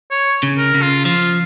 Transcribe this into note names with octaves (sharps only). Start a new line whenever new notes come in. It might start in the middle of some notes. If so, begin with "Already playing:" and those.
C#5
C#3
A#4
C#3
F4
F3 F4